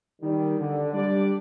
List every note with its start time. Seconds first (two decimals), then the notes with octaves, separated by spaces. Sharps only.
0.22 D#3 G3
0.59 D3
0.93 G3 D4 D5